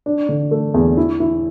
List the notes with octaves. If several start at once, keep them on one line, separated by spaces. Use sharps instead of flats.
D4
D3
A3
E2
E4
E4